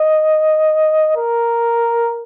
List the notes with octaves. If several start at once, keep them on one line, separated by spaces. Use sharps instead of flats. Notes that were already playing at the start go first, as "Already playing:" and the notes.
Already playing: D#5
A#4